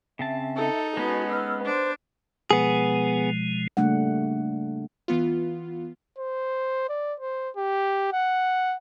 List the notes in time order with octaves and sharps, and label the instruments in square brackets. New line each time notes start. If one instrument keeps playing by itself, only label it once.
[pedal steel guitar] C#3 C4 A5 [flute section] E5
[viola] D#4 [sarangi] A4
[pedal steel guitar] G#3 C#4 [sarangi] B3 [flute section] F#4
[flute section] E6 F6
[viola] D4 [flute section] C5
[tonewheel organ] B2 F3 G#3 [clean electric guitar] B3 G#4
[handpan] C#3 G3 A3 A#3 D4 F#5
[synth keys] E3 B3 F4
[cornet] C5
D5
C5
G4
F#5